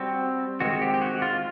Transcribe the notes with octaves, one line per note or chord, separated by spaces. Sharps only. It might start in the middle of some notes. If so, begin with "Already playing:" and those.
Already playing: G3 C4 F#4
D#3 G#3 C4 F#4
G4
G4
F#4
F4